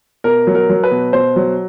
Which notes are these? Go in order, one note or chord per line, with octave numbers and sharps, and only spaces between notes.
B2 A#4
F#3
A#4
F#3
B4
B2
B2 C5
F#3